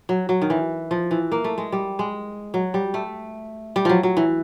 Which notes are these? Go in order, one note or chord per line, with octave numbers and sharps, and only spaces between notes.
F#3
F#3
D#3
E3
F3
E3
A#3
A3
G#3
G3
G#3
F#3
G3
A3
G3
F3 F#3
F#3
E3